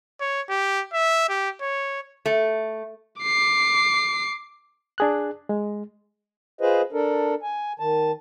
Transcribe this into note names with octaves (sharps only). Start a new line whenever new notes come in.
C#5
G4
E5
G4
C#5
A3
D6 C7
D4 G#4 F#6
G#3
F4 G#4 B4 C5 D#5
D4 A4 A#4
G#5
D#3 A5